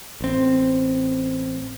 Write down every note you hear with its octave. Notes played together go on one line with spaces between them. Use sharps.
A1 C4